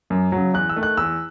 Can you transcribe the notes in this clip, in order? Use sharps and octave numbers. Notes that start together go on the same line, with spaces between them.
F#2
C#3 F#3
E2 F#6
E6
D#3 A3
F#6
E2 E6